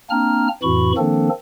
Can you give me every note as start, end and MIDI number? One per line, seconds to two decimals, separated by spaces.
0.10 0.48 58
0.10 0.48 60
0.10 0.48 62
0.10 0.48 82
0.10 0.48 89
0.63 0.92 41
0.63 0.92 45
0.63 0.92 52
0.63 0.92 66
0.63 0.92 83
0.63 0.92 85
0.97 1.29 51
0.97 1.29 53
0.97 1.29 58
0.97 1.29 60
0.97 1.29 62
0.97 1.29 69